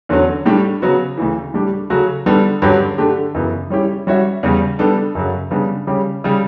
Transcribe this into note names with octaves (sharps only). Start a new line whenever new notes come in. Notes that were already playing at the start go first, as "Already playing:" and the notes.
E2 D3 F#3 C#4
A2 G3 D4 G4
C#3 F#3 B3 F#4
D2 C#3 E3
A2 G3 D4 G4
C#3 F#3 A3 C#4 F#4
D3 G3 B3 D4 A4
G2 D3 F#3 C#4 G4
D3 A3 D4 G4
F#2 C#3 E3 B3
G3 C#4 E4 G4
G3 C#4 F#4 C#5 E5
E2 C#3 G3
G3 B3 D4 A4
F#2 C#3 F#3
C#3 G3 B3 D4
C#3 G3 C#4 G4
C#3 G3